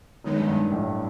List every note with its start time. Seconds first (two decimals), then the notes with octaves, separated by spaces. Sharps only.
0.24 F#2 D#3 G#3 B3 D#4
0.37 G2
0.48 G2
0.71 A1 A2